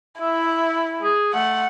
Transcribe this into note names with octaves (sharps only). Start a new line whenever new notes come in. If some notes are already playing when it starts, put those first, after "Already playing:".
E4 E5
G#4
A3 F#5